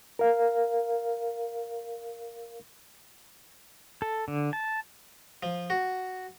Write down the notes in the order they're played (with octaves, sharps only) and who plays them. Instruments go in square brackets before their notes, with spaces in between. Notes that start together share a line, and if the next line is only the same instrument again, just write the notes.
[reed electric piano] A#4 F5
[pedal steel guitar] A4
D3
A5
[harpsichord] F3
F#4